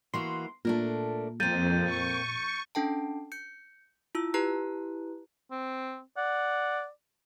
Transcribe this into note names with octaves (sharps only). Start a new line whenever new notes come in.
E3 A#3 F#4 C6
A#2 A3 D4 A#4
F2 A#3 C4 G6 A6 D#7
C#6
C#4 D4 A4 G5 A5
G6 C#7
E4 F4 E6
E4 G4 B4 A#5 F#6
C4
D5 F#5